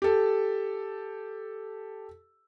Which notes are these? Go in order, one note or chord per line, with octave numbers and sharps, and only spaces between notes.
G4 A4